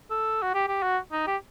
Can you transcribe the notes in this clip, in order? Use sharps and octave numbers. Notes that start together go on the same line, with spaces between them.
A4
F#4
G4
G4
F#4
D#4
G4